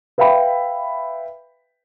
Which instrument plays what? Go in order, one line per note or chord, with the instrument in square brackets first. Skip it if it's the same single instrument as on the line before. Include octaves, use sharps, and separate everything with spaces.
[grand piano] B4 E5 F5 G5 B5